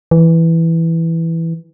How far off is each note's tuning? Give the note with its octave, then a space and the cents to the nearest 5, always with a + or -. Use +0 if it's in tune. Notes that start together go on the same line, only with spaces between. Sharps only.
E3 +0